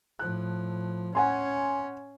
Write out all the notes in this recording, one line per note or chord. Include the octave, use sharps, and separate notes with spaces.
A2 F3 F#6
C#4 F#5 G#5 C6